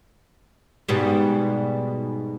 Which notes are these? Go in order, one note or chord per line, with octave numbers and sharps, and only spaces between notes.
G#2 B2 G3